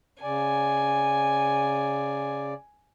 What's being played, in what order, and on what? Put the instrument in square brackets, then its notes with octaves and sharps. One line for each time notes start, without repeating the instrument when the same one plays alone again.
[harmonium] C#3 D5 [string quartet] G#5